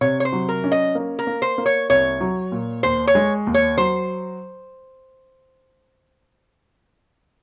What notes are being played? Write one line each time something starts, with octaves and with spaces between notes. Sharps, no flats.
C3 C#5
C#5
C5
F#3
A#4
C#4
D#5
A#3
A#4
A#3
C5
A#3
C#5
C2 C#5
F#3
A#2
D#2 C5
C#5
G#3
D#2
C#5
F#3 C5